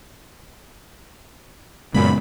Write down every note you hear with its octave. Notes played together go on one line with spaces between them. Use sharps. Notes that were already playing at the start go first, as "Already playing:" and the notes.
F#2 A#2 C#3 G#3 B3 B5